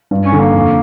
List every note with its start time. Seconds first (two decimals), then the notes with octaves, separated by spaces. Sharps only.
0.11 G2
0.25 C#4
0.32 D3
0.39 A#3
0.54 F2